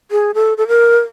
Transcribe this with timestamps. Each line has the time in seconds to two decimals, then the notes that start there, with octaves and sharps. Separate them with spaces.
0.11 G#4
0.34 A4
0.58 A4
0.68 A#4